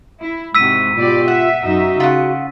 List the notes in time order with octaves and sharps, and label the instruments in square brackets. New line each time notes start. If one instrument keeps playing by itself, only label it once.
[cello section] E4
[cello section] G#2 C3 F#4 [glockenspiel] E6 B6 D#7
[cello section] B2 G4 D5 [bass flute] F4
[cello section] E5 [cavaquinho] F#5
[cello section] F#2 D#4 E5 [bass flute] F#4
[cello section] C#3 [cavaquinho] F4 F#5